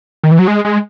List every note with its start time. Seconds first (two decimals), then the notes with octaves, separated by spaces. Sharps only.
0.24 D#3
0.31 E3
0.39 F#3
0.48 G#3
0.65 G#3